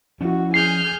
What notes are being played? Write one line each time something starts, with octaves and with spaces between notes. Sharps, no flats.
F3 C#4 E4 F#4
G#4 G#5 F6 G6 C7